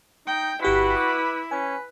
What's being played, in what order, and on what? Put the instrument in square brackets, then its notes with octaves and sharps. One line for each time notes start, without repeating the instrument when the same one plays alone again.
[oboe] D#4 [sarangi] G5
[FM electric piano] G1 G4 B6 [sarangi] E4 [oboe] F#4 [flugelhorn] B4
[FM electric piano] D6
[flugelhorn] C#4 [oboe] B4 [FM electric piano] G#5